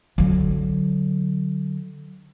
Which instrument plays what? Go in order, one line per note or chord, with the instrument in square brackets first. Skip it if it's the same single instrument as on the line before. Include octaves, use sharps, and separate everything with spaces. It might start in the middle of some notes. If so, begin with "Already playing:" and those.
[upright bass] D3 F#3